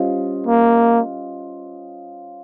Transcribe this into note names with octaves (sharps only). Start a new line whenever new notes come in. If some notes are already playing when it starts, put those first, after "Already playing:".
Already playing: G3 C#4 F4 C5 D#5
A#3